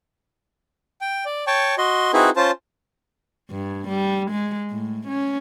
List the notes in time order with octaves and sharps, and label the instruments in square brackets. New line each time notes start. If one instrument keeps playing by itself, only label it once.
[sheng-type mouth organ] G5
D5
C#5 G5 A5 C#6
F#4 D#5 C6
C4 D#4 E4 F#4 G#4 B4
C#4 F4 C5 A5
[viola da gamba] G2
G3
G#3
A2
C#4